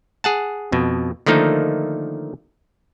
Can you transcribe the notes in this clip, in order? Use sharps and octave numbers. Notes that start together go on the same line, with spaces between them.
G#4 F#5 A5
F2 B2
D3 D#3 F3 A3 A#3 D#4